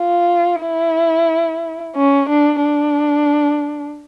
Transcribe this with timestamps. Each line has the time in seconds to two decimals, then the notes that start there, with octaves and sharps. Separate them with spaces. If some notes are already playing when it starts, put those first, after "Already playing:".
Already playing: F4
0.61 E4
1.95 C#4
2.29 D4
2.62 D4